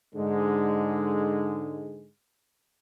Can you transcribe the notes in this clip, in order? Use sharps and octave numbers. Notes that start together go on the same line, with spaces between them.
G#2 D3 G#3